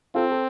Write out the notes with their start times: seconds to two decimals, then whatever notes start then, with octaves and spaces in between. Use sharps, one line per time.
0.15 C4 F4 A4
0.31 A4